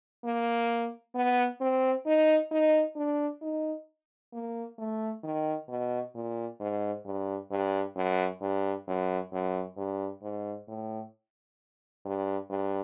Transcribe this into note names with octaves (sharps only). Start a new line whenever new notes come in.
A#3
B3
C4
D#4
D#4
D4
D#4
A#3
A3
D#3
B2
A#2
G#2
G2
G2
F#2
G2
F#2
F#2
G2
G#2
A2
G2
G2